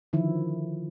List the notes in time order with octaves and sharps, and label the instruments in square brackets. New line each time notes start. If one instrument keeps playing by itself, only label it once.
[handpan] D3 D#3 F3 E4